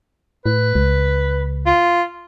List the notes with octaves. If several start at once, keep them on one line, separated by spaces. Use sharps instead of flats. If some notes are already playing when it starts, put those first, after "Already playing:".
A2 B4
C#2
F4